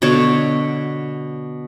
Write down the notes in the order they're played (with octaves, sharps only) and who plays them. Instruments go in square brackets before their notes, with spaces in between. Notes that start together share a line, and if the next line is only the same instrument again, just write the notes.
[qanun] B2 D3 C#5 A5